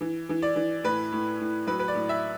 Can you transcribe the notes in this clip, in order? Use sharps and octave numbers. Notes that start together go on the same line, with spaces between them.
E3
E3
D5
E3
A2 B4
A2
A2
F#3 B4
B4
D5
A2
E5